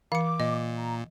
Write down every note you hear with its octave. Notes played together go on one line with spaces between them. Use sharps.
E3 F5 D6 C#7
A#2 D#5
A#5